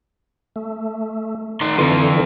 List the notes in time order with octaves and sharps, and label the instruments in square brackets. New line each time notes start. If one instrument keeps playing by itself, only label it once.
[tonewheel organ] A3
[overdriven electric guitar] D#3 C6
[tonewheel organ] D3 E3 [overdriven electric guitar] C4 F4